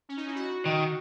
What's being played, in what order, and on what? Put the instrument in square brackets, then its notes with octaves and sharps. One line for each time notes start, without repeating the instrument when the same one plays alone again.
[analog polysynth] C#4
D#4
E4
F#4
[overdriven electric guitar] D#3